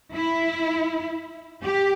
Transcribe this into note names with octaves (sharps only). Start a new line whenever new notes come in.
E4
G4